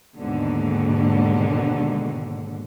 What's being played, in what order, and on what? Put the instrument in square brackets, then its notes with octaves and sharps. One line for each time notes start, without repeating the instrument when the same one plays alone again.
[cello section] D#2 G#2 B2 D3